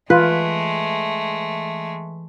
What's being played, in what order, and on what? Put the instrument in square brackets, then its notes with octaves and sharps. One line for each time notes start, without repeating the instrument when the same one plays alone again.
[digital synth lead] E3 [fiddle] G#3 A3 [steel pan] F4 [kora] B4